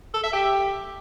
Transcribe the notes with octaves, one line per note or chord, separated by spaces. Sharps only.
A4
E5
G4